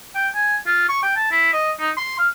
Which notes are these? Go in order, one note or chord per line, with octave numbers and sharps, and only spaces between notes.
G5
G#5
F4
C#6
G5
A5
E4
D#5
D#4
C6
F5